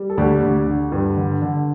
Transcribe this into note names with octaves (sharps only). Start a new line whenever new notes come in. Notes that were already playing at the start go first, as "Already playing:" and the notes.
Already playing: G3
A4
D2 D4 G4
D2
D3
G2
D3
D3